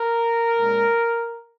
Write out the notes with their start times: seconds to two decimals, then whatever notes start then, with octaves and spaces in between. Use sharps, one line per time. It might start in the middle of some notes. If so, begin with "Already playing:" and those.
Already playing: A#4
0.56 A#2 G#3 C#4